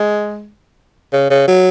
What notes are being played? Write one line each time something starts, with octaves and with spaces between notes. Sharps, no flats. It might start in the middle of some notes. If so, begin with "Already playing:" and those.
Already playing: G#3
C#3
C#3
F#3